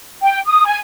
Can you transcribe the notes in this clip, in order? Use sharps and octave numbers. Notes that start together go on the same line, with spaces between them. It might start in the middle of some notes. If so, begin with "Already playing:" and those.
G5
D#6
G#5